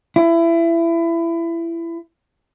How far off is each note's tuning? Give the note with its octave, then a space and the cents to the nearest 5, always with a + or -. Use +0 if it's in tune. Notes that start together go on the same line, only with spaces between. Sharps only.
E4 +25